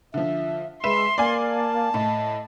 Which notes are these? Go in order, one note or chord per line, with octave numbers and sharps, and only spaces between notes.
D3 F3 E5
G#3 B4 E5 C6 E7
A#3 D5 F5 G#5
A5
A2 D#5